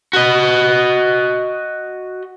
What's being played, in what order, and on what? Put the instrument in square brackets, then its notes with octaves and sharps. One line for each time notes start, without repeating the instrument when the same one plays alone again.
[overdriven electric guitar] F#4 D#5